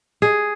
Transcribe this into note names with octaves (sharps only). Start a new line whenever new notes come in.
G#4